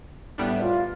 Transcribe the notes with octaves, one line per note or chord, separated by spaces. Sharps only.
A2 G3 B3 D4 E5
F4